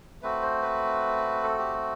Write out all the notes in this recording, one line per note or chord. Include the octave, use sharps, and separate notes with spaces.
A3 C4 F#4 B4
C5
B4
A4
G4